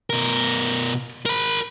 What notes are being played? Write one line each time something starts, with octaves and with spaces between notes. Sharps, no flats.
B2 A#4
A#4 B5